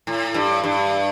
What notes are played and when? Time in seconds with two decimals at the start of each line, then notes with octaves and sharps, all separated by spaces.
0.07 A2
0.34 G2
0.64 G2